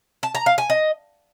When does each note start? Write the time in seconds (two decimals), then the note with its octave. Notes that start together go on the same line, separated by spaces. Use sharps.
0.23 A5
0.35 A#5
0.46 F5
0.58 G#5
0.70 D#5